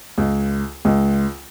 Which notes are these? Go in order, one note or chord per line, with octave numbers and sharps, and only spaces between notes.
C#2
C#2